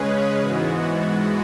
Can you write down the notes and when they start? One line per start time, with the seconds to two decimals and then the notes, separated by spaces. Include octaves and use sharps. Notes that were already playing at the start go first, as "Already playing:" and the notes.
Already playing: C#3 G#3 C#4 G#4 B4
0.38 G#2 E3 G#3 B3 F#4